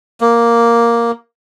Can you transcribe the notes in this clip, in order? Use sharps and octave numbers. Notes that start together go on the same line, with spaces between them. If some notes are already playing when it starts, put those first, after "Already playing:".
A#3